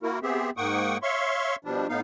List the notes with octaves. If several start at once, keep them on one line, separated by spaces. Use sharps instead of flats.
A#3 E4 F#4 A#4
B3 C4 G4 G#4 E5
G#2 A#3 F#5 G5 C#6 D#6
C#5 E5 F5 C6 C#6
B2 F3 G3 D4
A2 B3 D#4 F5